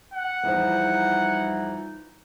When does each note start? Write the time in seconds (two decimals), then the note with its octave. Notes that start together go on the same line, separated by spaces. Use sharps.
0.14 F#5
0.43 E2 E3 F3 G3 D#4